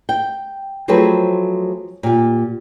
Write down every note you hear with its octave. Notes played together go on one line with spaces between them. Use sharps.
G5
F3 F#3 A3 C4 G#4 B4
A#2 G4